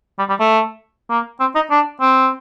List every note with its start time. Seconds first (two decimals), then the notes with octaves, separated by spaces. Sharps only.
0.19 G3
0.29 G3
0.40 A3
1.10 A#3
1.40 C4
1.55 D#4
1.71 D4
2.01 C4